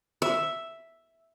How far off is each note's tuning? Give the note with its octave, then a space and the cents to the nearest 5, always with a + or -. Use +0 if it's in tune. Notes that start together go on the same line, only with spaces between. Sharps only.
E5 +0